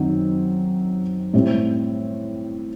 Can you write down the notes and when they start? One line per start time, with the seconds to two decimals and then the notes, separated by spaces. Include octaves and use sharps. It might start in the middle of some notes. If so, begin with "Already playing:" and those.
Already playing: F#2 D#3 F#3 C4
1.34 A2 G3 C4